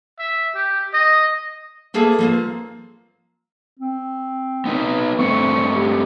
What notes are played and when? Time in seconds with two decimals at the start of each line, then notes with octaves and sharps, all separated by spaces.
0.19 E5
0.55 G4
0.93 D#5
1.94 A3 A#3 G#4 A4 B4
2.19 F3 A#3 C4
3.80 C4
4.65 B3 D#4 B4
5.19 G2 A3 C4 C#6
5.73 G4